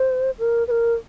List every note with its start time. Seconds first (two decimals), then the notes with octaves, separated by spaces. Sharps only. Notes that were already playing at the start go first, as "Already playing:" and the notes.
Already playing: C5
0.39 A#4
0.68 B4
0.71 A#4